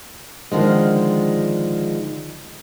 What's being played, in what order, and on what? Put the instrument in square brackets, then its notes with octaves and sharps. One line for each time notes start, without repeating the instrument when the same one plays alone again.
[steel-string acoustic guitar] D3 D#3 F3 G#3